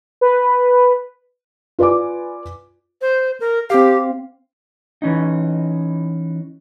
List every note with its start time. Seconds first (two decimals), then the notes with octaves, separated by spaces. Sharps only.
0.21 B4
1.79 F4 B4 D5 G#5 D6
3.02 C5
3.40 A#4
3.70 C4 G4 F5
5.02 E3 C#4 D#4